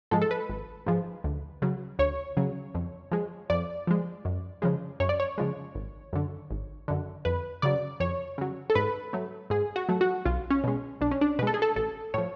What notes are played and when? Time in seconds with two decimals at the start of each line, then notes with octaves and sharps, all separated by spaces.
0.11 G#2 F3 G#3 A4
0.22 A4
0.31 B4
0.49 G#1
0.86 G#2 F3 G#3
1.24 D2
1.62 C#3 F#3
1.99 D2 C#5
2.37 C#3 F#3
2.74 F2
3.12 F3 G#3
3.50 F2 D5
3.87 F3 G#3
4.25 F#2
4.62 C#3 F3 G#3
5.00 F#2 C#5
5.09 D5
5.20 C#5
5.38 C#3 F3 G#3
5.75 G#1
6.13 F#2 D3
6.50 G#1
6.88 F#2 D3
7.25 F2 B4
7.62 C#3 F#3 D5
8.00 F2 C#5
8.38 C#3 F#3
8.70 A4
8.75 G#2 B4
9.13 F#3 A3
9.50 G#2 G#4
9.76 F#4
9.89 F#3 A3
10.01 F#4
10.25 B1 F4
10.51 C#4
10.64 B2 G#3
11.01 B1 D4
11.11 C#4
11.21 D4
11.39 B2 B4
11.43 G#3 A4
11.54 G#4
11.62 A4
11.76 A1 A4
12.14 A2 F3 C#5